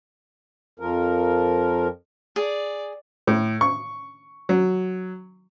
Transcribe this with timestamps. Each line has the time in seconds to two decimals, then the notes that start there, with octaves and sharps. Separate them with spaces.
0.80 F2 F3 A#4
2.36 G#4 D5
3.27 A2
3.61 C#6
4.49 F#3